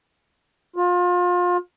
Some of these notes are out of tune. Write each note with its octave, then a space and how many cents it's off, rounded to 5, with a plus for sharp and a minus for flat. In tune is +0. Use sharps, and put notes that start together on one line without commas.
F4 +30